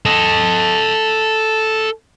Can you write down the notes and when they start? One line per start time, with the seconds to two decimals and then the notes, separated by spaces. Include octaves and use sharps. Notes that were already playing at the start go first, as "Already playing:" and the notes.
0.06 A4 D#5